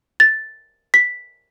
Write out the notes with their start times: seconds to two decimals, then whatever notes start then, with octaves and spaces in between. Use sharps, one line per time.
0.20 A6
0.94 B6